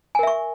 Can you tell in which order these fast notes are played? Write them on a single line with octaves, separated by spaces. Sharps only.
G#5 A#4 E5 C#6